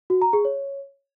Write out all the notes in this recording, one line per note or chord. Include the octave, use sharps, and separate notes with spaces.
F#4
A#5
G#4
C#5